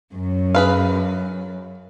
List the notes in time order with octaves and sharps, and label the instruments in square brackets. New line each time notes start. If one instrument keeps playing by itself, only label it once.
[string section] F#2
[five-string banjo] G#4 B4 F5